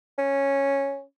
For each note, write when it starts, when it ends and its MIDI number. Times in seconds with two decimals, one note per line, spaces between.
0.18 1.02 61